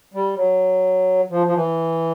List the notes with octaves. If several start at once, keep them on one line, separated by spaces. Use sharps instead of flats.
G3
F#3
F3
F3
E3